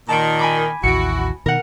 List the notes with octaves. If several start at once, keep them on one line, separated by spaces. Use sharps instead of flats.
A#2 D#3 A5 D7
G#5 B5 D6
A1 D#2 E4 F#4 C#7 D7
B2 D#3 A#4 F#5